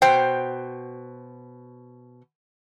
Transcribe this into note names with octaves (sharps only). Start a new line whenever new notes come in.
B2 C5 G5